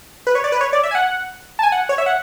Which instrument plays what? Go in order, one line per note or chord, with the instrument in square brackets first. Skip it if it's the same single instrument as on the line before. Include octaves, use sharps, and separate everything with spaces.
[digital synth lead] B4
C#5
D5
B4
C#5
D5
E5
G#5
F#5
A5
G#5
F#5
C#5
E5
F#5